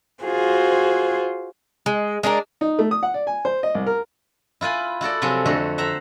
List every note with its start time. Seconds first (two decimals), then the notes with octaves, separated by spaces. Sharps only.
0.25 F4 F#4 G#4 C5
1.86 G#3
2.23 G#3 D4 F#4 A#4
2.61 D#4
2.79 A3
2.91 D#6
3.03 F#5
3.14 D5
3.27 G#5
3.45 C5
3.63 D#5
3.75 C2
3.86 A#4
4.61 E4 F4 B4 G#5
5.01 E4 F#4 A4 D5
5.22 C3 F3 F#3 C4 G#4 A4
5.46 F2 D3 A3 F#4
5.78 C5 E5 F#5 A#5